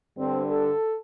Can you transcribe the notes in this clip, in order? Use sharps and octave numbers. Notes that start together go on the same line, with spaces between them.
G2 D3 C4
A4